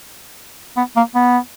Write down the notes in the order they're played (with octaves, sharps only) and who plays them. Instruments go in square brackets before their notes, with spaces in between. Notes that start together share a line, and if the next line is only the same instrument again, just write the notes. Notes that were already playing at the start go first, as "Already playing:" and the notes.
[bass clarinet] B3
A#3
B3